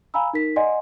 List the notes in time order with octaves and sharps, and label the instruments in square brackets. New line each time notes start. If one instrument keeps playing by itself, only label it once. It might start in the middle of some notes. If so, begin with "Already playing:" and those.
[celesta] F5 G#5 A#5 B5 E6
D#4 A#4 B6
D5 D#5 F#5 G#5 C6